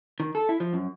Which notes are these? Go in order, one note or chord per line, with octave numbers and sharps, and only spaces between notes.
D#3
A4
E4
F3
F#2